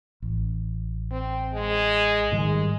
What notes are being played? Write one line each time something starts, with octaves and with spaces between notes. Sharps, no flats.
A1
C4
G#3
G#2 D#3 G3 G#3